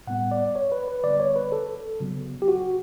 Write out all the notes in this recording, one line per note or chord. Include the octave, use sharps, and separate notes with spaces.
A2 G3 B3 F#5
D5
C#5
B4
B4
D3 G3 B3 D5
C#5
B4
A4
C#3 F#3 B3
G4
F#4